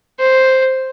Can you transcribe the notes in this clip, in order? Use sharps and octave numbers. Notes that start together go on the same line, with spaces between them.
C5